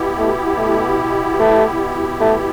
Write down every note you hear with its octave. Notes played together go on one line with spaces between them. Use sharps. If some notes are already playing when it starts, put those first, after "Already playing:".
Already playing: B2 B3 E4 G4
A3
A3
A3
A3